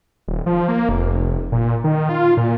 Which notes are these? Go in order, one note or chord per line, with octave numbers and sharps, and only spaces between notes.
D#1
F3
A#3
F1
A#2
D#3
F4
A#2